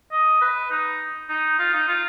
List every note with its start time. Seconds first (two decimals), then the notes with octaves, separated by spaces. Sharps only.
0.12 D#5
0.41 B4
0.71 D#4
1.29 D#4
1.59 F4
1.74 D#4
1.88 F4